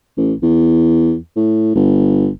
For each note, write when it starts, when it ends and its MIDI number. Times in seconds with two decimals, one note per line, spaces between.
0.17 0.33 33
0.43 1.16 40
1.36 1.74 45
1.75 2.29 31